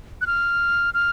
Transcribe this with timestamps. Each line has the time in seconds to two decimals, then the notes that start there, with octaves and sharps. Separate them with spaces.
0.21 F#6
0.27 F6
0.94 F6